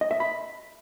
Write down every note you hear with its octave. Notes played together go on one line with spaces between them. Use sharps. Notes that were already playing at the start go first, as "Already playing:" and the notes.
D#5
E5
B5